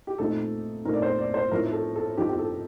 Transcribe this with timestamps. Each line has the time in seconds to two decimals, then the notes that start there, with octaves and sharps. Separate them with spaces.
0.07 G4
0.18 A#2 A3 C4 D#4 A4
0.85 A#2 A3 C4 D#4 A#4
0.94 D5
1.02 C5
1.19 D5
1.34 C5
1.51 A2 F3 C4 D#4 A#4
1.73 A4
1.96 A4
2.17 A2 F3 C4 D#4 G4
2.29 G4
2.39 A4